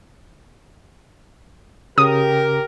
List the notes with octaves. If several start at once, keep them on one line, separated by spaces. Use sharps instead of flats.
C#3 G4 A#4 D#6